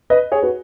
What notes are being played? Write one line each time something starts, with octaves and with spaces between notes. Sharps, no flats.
B4 D#5
G#4 C#5
F#4 B4